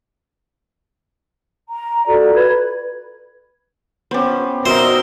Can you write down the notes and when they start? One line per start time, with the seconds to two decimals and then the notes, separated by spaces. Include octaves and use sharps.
1.68 A#5
2.07 F4 F#4 A4 D5
2.35 B4 B5 G#6
4.11 B3 C#4 G4 C5
4.66 B2 C4 D#4 A#4 C5 D#5 E5